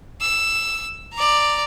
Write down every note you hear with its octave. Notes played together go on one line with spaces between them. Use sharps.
E6
D5 A#5